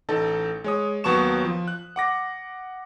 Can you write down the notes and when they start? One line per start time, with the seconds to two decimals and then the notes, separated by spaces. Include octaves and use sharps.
0.09 A1 D#4 A4 A5
0.64 G#3 C#5 D#6
1.04 D#2 F#3 B3 A5 C#6 E7
1.45 F3
1.68 F#6
1.96 F#5 D6 A#6